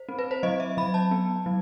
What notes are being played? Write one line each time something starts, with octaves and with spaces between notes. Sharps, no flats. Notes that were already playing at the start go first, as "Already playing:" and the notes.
Already playing: C5
C4
B4
C5
F#3 D#5
E5
F#3 B5
A5
B3
F#3